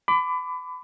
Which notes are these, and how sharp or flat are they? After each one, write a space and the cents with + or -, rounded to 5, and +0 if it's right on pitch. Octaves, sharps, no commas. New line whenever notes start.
B5 +30 D6 +0